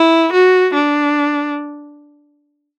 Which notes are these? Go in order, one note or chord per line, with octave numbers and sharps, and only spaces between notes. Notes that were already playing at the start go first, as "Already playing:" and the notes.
Already playing: E4
F#4
D4